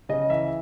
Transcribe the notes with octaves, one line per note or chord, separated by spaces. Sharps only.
C#3 D#5
E3 E5